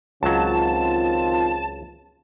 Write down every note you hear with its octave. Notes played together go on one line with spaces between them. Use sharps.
C#2 D#3 F#3 C4 F4 A5